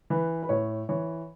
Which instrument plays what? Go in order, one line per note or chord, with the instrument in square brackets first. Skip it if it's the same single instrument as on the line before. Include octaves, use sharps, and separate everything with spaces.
[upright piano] E3 B4
B4
A2 C#5
E3 C#5